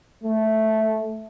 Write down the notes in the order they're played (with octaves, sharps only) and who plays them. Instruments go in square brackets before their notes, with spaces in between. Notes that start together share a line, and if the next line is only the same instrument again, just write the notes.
[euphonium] A3